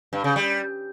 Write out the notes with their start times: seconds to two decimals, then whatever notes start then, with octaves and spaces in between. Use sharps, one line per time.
0.13 G2
0.24 C#3
0.36 G3